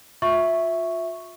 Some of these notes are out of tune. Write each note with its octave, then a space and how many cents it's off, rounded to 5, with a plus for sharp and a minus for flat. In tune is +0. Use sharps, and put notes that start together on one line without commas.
F4 +35 E5 +0 C#6 +0